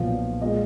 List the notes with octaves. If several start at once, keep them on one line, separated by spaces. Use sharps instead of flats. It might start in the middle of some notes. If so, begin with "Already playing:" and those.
Already playing: B1 A#2 F3 B3 F5
A#2 G#3 D#5